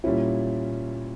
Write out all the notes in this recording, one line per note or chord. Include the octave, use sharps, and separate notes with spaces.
A#2 G3 C#4 E4